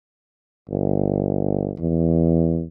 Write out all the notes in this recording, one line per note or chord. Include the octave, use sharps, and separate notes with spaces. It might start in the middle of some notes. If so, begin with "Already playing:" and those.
G1
E2